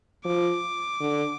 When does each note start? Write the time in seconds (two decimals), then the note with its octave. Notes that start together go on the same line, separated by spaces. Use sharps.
0.25 F3 D6
1.00 D3